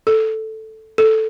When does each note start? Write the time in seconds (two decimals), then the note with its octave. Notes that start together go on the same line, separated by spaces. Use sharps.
0.07 A4
0.98 A4